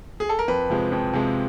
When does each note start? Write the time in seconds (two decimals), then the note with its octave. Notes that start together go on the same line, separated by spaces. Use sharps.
0.20 G#4
0.29 A4
0.39 A#4
0.48 F2 B4
0.70 C3 F3 G#3
0.92 F2
1.13 C3 F3 G#3